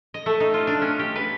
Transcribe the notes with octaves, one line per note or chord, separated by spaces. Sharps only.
D#5
A3
D#4
F4
D4
C#4
G4
B4